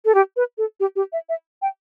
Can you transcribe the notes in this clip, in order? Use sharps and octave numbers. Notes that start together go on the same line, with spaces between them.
A4
G4
B4
A4
G4
G4
E5
E5
G5